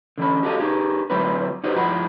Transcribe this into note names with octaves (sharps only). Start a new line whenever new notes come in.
D3 E3 C#4 B5
F#4 G4 A4 D5 D#5 F5
D#4 G4 G#4
D2 F#3 C4 E4 A#4 B4
D#4 F#4 G4 B4 C5 D#5
G2 F3 E4 F#5 B5